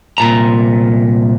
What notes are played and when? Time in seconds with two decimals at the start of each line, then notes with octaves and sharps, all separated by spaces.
0.18 C2 A#2 A#5